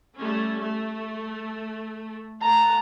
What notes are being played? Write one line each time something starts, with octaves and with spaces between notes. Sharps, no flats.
G3 A3 C#4
A3
A3 F#5 A5 A#5